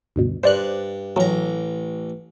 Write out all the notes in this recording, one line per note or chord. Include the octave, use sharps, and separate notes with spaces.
D2 G2 B2
G2 C5 D5 F#6
A1 F#3 A#5